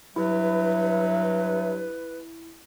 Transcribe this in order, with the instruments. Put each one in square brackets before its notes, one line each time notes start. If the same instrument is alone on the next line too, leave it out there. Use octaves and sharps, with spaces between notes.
[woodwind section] G2 F#3 [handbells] E4 [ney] B4 [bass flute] E5